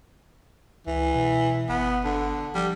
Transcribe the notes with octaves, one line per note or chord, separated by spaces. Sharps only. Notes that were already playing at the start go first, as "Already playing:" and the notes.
C#2 E3
B2
G1 B3
D3
F3 G3